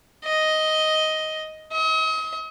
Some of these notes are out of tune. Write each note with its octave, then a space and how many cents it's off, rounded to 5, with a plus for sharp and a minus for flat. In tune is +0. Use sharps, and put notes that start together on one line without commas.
D#5 +5
D#5 +40